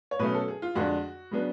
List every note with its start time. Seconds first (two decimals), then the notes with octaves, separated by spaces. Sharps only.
0.11 C#5
0.19 B2 F#3 A3 C#4 B4
0.34 A4
0.48 G#4
0.62 F4
0.75 F2 D3 G#3 D4 F#4
1.31 C#3 F#3 B3 D4